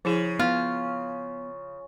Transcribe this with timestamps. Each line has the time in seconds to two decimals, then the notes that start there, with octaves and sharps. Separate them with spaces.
0.05 C#3 F3 E4 G#4
0.39 B3 F4